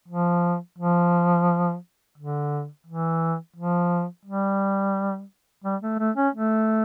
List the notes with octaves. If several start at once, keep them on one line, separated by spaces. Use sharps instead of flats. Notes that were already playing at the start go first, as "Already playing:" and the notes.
F3
F3
D3
E3
F3
G3
G3
A3
A3
C#4
A3